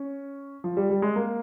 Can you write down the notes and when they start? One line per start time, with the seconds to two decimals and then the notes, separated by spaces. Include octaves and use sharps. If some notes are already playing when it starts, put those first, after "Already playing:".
Already playing: C#4
0.64 F3
0.77 G3
0.90 G3
1.02 G#3
1.16 A#3